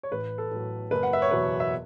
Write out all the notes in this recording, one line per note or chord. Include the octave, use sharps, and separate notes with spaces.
C#5
A1 B4
A4
A2 F#3
F#1 B4
F#5
E5
C#5
E2 B2 F#3 B4
E5